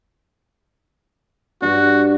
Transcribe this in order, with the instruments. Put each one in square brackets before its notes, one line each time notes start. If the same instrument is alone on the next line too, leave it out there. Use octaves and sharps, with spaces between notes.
[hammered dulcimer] G2 D4 [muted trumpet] F#4